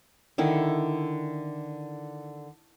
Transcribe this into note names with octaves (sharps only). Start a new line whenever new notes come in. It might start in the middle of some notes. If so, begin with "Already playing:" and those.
D3 D#3 E4